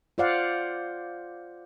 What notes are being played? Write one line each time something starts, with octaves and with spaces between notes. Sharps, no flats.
F4 C5 D5 F5 F#5